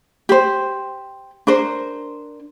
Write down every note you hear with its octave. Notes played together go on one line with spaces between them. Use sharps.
G4 C5
D4 A#4 C5